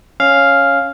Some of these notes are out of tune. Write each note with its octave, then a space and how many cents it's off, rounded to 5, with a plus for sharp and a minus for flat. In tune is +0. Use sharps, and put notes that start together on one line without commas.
C#4 +0 F5 +0